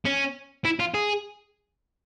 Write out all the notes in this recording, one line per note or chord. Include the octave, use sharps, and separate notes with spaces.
C#4
E4
F4
G#4